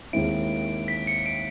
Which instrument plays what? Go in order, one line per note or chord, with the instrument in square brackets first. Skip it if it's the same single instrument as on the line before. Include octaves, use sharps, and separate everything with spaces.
[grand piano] D#2 D#3 G#3 C4 E4 [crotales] D7
[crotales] B6
C#7
D7